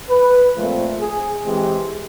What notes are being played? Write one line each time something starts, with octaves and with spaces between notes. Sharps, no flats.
B4
A#2 F3 A3 C4
G#4
E3 G#3 C4 G4